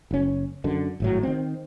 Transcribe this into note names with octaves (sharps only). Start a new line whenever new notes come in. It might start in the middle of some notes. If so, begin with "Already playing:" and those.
F#1 C#4
F#2 D3
G#1 A2 F#3
D#3 C4